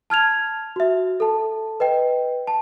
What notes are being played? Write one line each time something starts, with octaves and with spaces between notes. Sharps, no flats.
A5 F6 G#6 F7
F#4 E5
A4 A5
B4 D#5 G5
A5